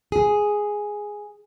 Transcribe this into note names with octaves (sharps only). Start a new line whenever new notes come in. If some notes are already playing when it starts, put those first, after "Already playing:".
G#4